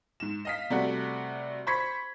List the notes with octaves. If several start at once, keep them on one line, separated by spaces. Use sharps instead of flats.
G#2 E7
D#5 F5 B6
C3 G3 A3 F#4
C5 B5 C#6 G#6 B6